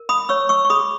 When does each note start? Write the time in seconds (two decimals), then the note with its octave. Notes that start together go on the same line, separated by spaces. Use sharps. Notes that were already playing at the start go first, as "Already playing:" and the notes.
Already playing: A#4
0.09 B5 D#6
0.29 C#5 C#6 E6
0.49 C#6 E6
0.65 C#6
0.70 G#4 B5 D#6